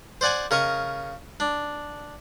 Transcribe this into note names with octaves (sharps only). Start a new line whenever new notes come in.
C5 D5 F#5 G#5
C#3 A#4 D#5 C#6
D4